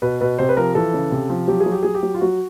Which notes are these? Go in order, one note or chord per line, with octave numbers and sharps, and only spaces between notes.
B2 B4
B2 B4
C3 C5
B4
F3 A#4
E3 A4
C#3
C3
F3
F#3 G4
G#4
F#3
G4
F#3 G#4
G4
F#3
F4
F#3 F#4